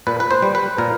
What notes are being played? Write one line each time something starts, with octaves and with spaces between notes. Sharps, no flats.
A#2 B4
B4
C5
G3
B4
A#2 A#4